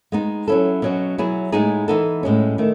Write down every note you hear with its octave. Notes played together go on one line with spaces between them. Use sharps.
G#3 B3 D#4
F#3 C#4 E4 A4
B2 F#3 C#4 F#4
F#3 B3 E4 G#4
A2 G#3 B3 D#4 G#4
E3 B3 D#4 A4
A2 G#3 C#4
D#3 A3